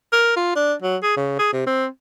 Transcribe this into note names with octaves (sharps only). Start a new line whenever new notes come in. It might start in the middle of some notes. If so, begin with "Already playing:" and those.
A#4
F4
D4
F#3
G#4
C#3
G#4
C3
C4